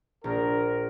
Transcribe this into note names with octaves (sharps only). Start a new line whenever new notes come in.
A#1 A#4